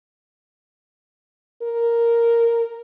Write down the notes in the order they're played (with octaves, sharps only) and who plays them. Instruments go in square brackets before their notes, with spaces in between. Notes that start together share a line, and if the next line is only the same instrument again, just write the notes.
[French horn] A#4